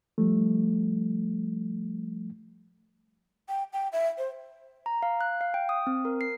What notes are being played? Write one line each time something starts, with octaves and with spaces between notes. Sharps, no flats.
F3 G3 A3
G5
G5
E5
C5
A#5
F5
F#6
F5
G5
D#6
C4
A#4
C7